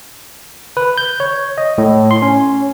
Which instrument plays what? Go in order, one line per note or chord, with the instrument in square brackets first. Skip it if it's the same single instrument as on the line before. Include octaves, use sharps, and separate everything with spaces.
[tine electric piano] B4
G6
C#5
D#5
A2
C6
C#4